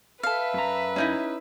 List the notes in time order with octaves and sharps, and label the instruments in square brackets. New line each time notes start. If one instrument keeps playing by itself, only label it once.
[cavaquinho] A4 F5 [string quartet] B4 E5
[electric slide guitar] F#2 A#5
[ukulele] C#4 D#4 E4